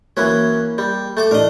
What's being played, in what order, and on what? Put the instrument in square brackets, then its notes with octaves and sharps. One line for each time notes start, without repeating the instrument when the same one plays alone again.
[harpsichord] E3 F#3 C#4 [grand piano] A#3
[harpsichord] G3
A3 A5 D6
[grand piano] A2 E3 D4 [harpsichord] A#4 D#5